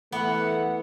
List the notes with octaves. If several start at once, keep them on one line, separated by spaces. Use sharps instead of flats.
E3 A3 B3 F#5